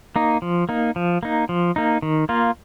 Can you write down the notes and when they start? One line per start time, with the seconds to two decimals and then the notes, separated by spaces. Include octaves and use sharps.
0.16 A#3 D#4
0.42 F3
0.69 A#3 D#4
0.96 F3
1.23 A#3 D#4
1.49 F3
1.76 A#3 D#4
2.02 D#3
2.29 A#3 F4